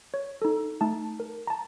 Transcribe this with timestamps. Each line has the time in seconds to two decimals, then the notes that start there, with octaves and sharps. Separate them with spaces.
0.14 C#5
0.42 D#4 A4
0.81 A3 D#4 A5
1.20 A#4
1.47 A5 A#5